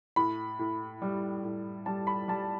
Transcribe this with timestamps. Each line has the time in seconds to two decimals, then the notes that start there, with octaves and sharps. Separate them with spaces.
0.16 A2 B5
0.59 A2
1.02 G3
1.44 A2
1.86 G3 A5
2.07 B5
2.28 G3 A5